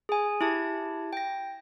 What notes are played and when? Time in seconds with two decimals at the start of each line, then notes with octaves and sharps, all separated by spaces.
0.09 G#4 G#5
0.41 E4 G4 A5 G#6
1.13 G5 A#6